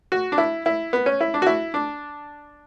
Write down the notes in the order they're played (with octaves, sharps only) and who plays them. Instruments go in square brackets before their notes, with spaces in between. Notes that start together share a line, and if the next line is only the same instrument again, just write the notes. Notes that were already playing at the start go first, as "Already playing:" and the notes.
[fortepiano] F#4
D4
E4
E4
B3
C#4
E4
D4
F#4
E4
D4